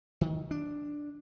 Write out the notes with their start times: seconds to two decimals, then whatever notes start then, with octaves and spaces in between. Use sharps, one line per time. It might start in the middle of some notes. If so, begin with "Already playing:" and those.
0.21 D#3
0.51 D4